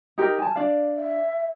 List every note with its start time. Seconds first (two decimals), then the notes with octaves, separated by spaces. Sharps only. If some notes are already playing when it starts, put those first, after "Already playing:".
0.18 D#4 G4 A#4
0.38 G#5 A5
0.56 D4 D5 F5
0.96 E5